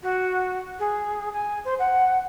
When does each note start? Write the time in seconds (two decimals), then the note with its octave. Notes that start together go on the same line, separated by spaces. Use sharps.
0.03 F#4
0.79 G#4
1.33 G#5
1.65 C5
1.79 F#5